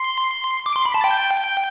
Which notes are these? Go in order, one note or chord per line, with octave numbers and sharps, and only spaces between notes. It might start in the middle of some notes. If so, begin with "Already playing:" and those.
Already playing: C6
D6
C6
B5
A5
G5